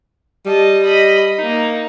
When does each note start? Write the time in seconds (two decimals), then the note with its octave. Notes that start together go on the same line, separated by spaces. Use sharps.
0.46 G3 D#5 A5
0.82 D#5 B5
1.37 A#3 D#4